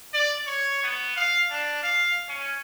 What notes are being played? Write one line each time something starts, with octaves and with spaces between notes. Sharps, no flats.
D5
C#5
B3
F5
D4
F5
C#4